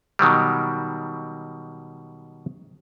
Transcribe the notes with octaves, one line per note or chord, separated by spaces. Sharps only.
B2 D#3 F#3 G3